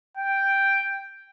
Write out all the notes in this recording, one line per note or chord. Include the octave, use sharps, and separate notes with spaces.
G5